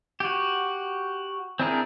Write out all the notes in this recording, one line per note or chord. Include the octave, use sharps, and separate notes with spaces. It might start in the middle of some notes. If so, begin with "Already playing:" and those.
F#4 G4
C4 D4 E4 G#4 A#4